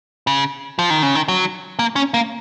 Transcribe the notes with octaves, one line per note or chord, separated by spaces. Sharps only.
C#3
F3
D#3
C#3
D#3
F#3
A#3
C#4
A#3